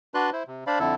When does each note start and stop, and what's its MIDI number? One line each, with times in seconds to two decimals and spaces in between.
0.14 0.30 62
0.14 0.30 66
0.14 0.30 71
0.14 0.30 74
0.14 0.30 84
0.14 0.30 90
0.33 0.43 64
0.33 0.43 72
0.48 0.64 48
0.67 0.79 62
0.67 0.79 72
0.67 0.79 74
0.67 0.79 77
0.67 0.79 83
0.79 0.95 41
0.79 0.95 50
0.79 0.95 64
0.79 0.95 69